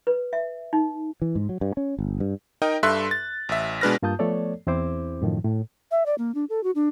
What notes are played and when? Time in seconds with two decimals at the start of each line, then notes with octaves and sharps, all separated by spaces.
0.07 B4
0.33 E5
0.73 D#4
1.22 E3
1.35 G#2
1.49 F#3
1.61 G2
1.77 C#4
1.99 G1
2.20 G2
2.62 D#4 A#4 D#5 G5
2.83 G2 A4 E5 C6 F#6
3.11 A6
3.49 A1 E5
3.81 B2 G#3 D4 B4 F6 A#6
4.02 G2 A#3 F4 A5 D#6 G6
4.19 F3 A3 B3 A4 C#5 D5
4.67 E2 C4 E4 C5 D6
5.22 F#2 A2 D#3 F3
5.45 A2
5.91 E5
6.06 D5
6.18 A#3
6.35 D4
6.49 A4
6.63 F#4
6.75 D4